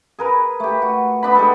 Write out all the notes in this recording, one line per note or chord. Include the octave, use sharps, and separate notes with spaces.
G#4 A#4 B4
A3 G4
F#4
B3 D4 B5
G#3 G4 A4